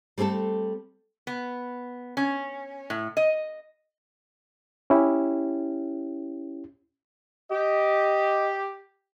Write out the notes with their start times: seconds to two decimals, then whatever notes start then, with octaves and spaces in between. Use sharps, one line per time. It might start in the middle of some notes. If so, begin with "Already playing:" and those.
0.18 G3 A3 C4 G#4 A4
1.27 B3
2.17 C#4
2.90 A2
3.17 D#5
4.90 C#4 E4 G4
7.51 G4 D#5